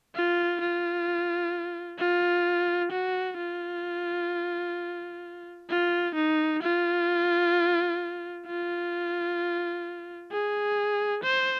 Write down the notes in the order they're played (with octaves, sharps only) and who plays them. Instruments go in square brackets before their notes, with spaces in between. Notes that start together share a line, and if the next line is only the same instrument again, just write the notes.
[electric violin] F4
F4
F4
F#4
F4
F4
D#4
F4
F4
G#4
C5